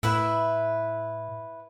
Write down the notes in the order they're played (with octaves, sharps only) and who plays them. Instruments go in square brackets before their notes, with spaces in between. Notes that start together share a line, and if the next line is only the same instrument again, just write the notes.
[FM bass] A2 [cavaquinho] E4 B4 E5